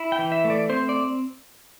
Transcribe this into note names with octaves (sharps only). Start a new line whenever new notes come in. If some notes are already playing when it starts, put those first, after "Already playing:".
Already playing: E4
G5
E3
E5
A3
D5
C4 C5
D5